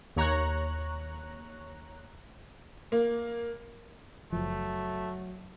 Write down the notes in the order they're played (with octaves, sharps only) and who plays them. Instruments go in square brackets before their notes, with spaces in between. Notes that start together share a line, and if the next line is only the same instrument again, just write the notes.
[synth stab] D#2 C#5 A#5 C#6 F#6
[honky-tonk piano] A#3
[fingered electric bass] F#1 F3 [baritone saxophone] F#3 [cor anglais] A3